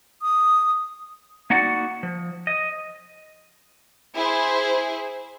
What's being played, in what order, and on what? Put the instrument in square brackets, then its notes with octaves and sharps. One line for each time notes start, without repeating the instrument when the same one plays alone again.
[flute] D#6
[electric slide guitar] A#3 D#4 F#4 D5 F#5
F3
D#5
[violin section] E4 G#4 C5